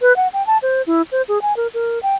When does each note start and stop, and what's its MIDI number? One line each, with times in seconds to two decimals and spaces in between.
0.01 0.15 71
0.16 0.28 78
0.33 0.45 79
0.47 0.58 81
0.62 0.82 72
0.87 1.02 64
1.12 1.22 72
1.29 1.41 68
1.42 1.56 80
1.57 1.67 70
1.74 2.01 70
2.03 2.15 79